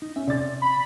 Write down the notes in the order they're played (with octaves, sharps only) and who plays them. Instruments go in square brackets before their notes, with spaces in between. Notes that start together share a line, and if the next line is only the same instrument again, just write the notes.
[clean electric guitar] D#4
[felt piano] C#4 [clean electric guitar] E5
[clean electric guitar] C3 [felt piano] D5 A6
[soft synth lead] B5